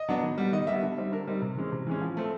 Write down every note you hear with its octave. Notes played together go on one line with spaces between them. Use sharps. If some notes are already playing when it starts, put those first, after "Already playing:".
Already playing: D#5
F#3 B3 D4
D#3
G3 B3
D#3 D#5
G3 B3 E5
D3
G3 C4 D#4
D3 A#4
G3 C4 D#4
C3
E3 G#3 C#4
C3
E3 G#3 C#4
F3
A3 C4